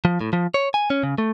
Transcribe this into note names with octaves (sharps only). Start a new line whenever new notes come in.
F3
A2
F3
C#5
G#5
C#4
C#3
A3